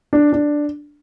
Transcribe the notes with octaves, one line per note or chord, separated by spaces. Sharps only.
D4
D4